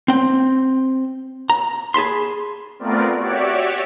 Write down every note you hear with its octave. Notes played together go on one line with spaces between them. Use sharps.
C4 G5
A#5
G#4 A5 B5 C6
A3 B3 C4 F4 A#4 D5
F#4 G4 C#5 D5 E5